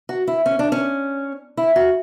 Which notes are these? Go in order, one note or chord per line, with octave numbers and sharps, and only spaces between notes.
F#4
E4
C#4
D4
C#4
E4
F#4